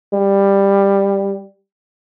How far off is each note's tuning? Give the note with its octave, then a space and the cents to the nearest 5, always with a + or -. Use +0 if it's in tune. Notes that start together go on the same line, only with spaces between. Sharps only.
G3 +10